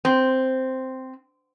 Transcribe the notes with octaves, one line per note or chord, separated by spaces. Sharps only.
C4